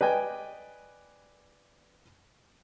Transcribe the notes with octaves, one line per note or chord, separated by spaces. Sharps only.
B4 D5 D#5 G5 G#5